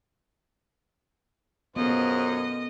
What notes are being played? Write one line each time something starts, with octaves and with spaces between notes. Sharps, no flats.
F#2 B3 F4 G#4 A4 C5 D#5